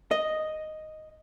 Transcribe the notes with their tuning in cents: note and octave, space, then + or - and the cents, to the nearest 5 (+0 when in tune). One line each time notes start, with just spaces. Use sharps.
D#5 +0